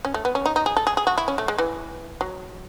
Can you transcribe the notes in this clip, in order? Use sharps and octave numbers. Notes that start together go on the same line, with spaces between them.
C#4
A3
B3
C#4
D#4
D#4
G#4
A4
G#4
G#4
F#4
E4
C#4
A3
G#3
E3
F#3